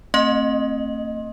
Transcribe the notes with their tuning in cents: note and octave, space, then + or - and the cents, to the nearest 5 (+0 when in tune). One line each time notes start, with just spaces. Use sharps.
A3 +45 C4 +30 D#5 +0